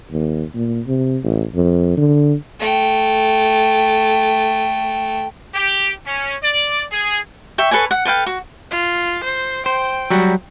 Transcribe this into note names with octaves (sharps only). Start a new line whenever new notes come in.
D#2
A#2
C3
A1
F2
D3
A3 G5
G4
C#4
D5
G#4
E5 G5 C#6
A4 B4 C#5 G#5
F#5
A4 B4 F5 G5
F#4
F4
C5
C5 G5
F#3 G3 F#4